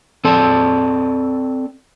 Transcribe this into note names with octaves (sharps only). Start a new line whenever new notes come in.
C4 A4 D5 A5